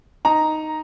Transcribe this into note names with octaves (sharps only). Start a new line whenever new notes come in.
D#4 A#5